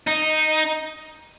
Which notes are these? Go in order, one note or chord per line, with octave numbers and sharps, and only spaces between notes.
D#4